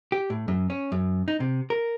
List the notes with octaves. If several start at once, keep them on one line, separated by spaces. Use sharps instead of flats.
G4
A2
F#2
C#4
F#2
D#4
C3
A#4